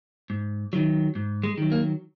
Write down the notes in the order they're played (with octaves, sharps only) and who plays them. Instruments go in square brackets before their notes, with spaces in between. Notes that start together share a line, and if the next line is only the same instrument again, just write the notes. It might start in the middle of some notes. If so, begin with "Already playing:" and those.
[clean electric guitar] G#2
D#3 F#3
G#2
G#3
D#3 F#3
A#3